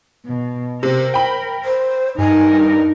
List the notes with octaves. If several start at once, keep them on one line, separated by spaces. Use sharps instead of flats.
B2
C3 A#4 C5
G5 B5
C5
G2 D#4 A#4 G#5
D4